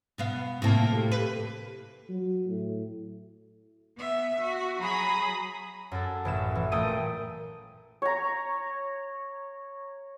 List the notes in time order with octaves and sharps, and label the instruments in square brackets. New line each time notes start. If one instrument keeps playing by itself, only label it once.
[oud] B2 B3 F5
[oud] A2 C3 A#3 [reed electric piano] C4 E4 A5
[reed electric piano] G4 A4
[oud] B4
[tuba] F#3
A2
[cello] B3 E5
F#4
[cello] F#3 G#4 [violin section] A#5 B5 D#6
[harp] F#2 A4
A1 A2 E7
E3
A#2 A3 G5 D#6 D#7
[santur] C#5 A#5